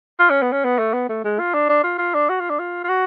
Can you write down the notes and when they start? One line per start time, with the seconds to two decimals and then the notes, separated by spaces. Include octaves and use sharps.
0.20 F4
0.30 C#4
0.42 B3
0.52 C#4
0.65 B3
0.79 A3
0.94 B3
1.09 A3
1.24 G#3
1.39 F4
1.54 D4
1.69 D4
1.84 F4
1.99 F4
2.14 D4
2.30 F#4
2.40 F4
2.50 D4
2.60 F4
2.84 F4
2.89 F#4